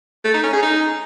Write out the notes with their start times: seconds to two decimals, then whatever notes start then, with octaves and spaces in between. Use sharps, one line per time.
0.24 A3
0.34 D#4
0.44 C#4
0.53 G#4
0.63 D#4